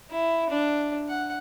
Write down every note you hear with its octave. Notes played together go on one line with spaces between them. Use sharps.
E4
D4
F#5